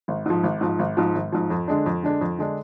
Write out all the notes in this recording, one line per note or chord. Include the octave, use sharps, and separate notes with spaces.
G#1
G#2 F3
G#1
G#2 F3
G#1
G#2 F3
G#1
G#2 F3
F2
D3 G#3 D4
F2
D3 G#3 D4
F2
D3 G#3 D4